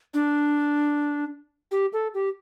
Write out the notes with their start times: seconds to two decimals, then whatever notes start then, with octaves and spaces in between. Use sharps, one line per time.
0.14 D4
1.71 G4
1.93 A4
2.14 G4